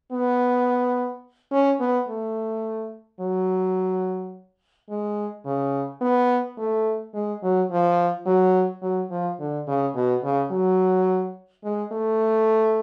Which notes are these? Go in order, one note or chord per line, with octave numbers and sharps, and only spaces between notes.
B3
C#4
B3
A3
F#3
G#3
C#3
B3
A3
G#3
F#3
F3
F#3
F#3
F3
D3
C#3
B2
C#3
F#3
G#3
A3